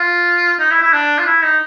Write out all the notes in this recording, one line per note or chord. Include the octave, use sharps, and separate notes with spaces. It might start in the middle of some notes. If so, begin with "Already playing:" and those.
Already playing: F4
D#4
E4
E4
D4
F4
E4
D#4